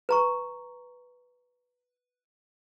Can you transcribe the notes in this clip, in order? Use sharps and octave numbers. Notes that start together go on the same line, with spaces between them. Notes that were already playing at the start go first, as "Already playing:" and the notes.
B4 A#5 C#6